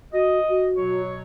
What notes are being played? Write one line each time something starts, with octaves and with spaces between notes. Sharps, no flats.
F#4 D#5
F#4
B2 F#3 C#5